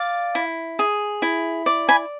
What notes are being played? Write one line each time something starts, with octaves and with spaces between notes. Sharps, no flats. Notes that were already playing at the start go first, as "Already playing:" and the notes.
Already playing: D5 F5
E4
G#4
E4
D5
G#5 B5